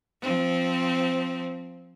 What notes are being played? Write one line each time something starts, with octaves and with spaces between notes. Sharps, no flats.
F3 C4